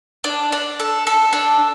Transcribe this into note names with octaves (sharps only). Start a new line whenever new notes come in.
D4
D4
A4
A4
D4